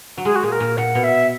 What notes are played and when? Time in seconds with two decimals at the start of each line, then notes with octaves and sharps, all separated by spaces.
0.17 F#3
0.25 G#3 G#4
0.36 F#4
0.43 A#2 G#4
0.52 A#4
0.60 A#2
0.77 A#2 F#5
0.95 B2
1.04 E5